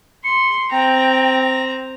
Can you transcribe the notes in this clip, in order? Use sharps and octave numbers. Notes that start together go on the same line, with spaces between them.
C6 C#7
C4 G5 A#5